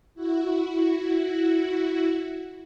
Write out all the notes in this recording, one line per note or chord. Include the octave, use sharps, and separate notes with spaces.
E4 F#4